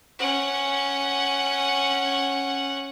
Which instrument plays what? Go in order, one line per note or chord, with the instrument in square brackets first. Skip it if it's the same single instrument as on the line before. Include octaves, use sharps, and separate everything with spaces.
[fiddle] C#4 F#5